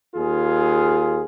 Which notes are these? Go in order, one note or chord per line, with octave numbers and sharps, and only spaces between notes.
D#2 F4 G#4